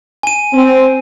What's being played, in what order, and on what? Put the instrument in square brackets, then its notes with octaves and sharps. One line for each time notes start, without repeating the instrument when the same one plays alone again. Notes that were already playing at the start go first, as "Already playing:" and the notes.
[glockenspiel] G#5 D#7
[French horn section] C4